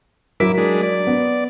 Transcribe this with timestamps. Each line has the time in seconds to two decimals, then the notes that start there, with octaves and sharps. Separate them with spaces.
0.40 F#3 E4 A#4 D6 B6
0.58 G#3 D4
0.83 D5
1.07 B3